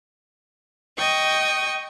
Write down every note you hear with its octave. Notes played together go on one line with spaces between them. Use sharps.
D#5 G5 C#6 D#6